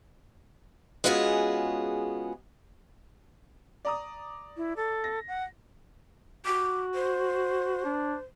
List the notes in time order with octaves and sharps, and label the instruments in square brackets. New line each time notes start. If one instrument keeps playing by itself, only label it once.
[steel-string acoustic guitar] G#3 B3 C#4 F4 F#4 G#4
[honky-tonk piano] D5 A#5 D#6
[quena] E4
A4
[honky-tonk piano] A#6
[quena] F#5
[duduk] F#4 [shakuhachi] D6
[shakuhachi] C5
[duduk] D4